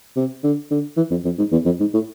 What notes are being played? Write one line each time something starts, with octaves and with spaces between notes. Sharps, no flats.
C3
D3
D3
E3
F2
F2
G#2
E2
F2
G#2
A2